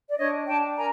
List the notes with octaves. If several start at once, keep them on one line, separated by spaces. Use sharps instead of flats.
D5
D4 C#5 D#5
D4 G5 A5
A#4 G#5 A#5